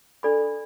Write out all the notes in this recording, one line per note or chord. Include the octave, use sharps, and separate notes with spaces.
D4 A4 D5 B5